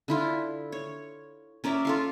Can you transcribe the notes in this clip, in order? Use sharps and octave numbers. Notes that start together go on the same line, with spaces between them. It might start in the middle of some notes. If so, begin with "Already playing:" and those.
D3 E4 F4
C#5
C#4 A#4 D5 E5
F4 A4 F5